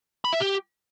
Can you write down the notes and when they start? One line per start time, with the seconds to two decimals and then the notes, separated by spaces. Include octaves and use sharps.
0.25 B5
0.33 E5
0.41 G4